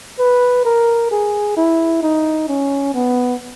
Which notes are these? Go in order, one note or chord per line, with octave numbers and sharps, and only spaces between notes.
B4
A#4
G#4
E4
D#4
C#4
B3